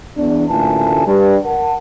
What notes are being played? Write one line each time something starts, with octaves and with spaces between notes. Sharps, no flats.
E2 D4
A1 D2 A#2 E3 G#5 A5
G2
A#4 F#5 A5